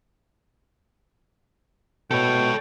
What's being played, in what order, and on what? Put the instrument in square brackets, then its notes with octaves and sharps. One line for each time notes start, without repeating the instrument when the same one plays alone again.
[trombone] B2 [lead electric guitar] A4 C#5 [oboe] G5